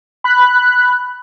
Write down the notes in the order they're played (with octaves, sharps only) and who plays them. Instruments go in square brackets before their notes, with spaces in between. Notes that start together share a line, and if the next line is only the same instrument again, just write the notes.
[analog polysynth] B5 F#6